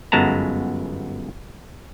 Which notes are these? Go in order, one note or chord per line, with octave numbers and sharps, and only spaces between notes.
G1 F#2 G#3 B3 A5 A#5